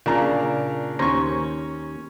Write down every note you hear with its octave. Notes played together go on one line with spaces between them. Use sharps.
A#2 C#3 D4 A#5
D#2 C#4 C5 A#5 C#6